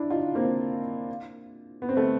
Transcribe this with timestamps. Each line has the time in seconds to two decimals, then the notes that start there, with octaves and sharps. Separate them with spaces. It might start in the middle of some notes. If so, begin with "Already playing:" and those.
Already playing: D4 E4
0.10 D#4 F4
0.35 A#3 C4
1.82 B3
1.89 C4
1.96 A3 B3